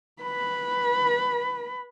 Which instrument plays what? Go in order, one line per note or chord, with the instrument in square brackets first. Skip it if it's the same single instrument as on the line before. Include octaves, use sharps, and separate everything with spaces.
[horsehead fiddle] B4 B5